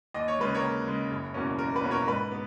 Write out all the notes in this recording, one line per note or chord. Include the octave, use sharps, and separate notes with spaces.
D#2 D#5
C#5
C#3 G#3 B4
A#4 C#5
D#2
C#3 G#3
F#1
E2 B2 A#3 C#4
F#1 A#4
B4
E2 B2 A#3 C#4
A#4 C#5
G#2 B4
B3